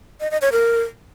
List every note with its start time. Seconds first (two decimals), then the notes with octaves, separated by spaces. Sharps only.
0.21 D#5
0.31 D#5
0.42 C#5
0.52 A#4